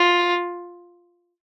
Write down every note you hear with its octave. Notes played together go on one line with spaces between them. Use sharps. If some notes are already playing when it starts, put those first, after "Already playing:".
Already playing: F4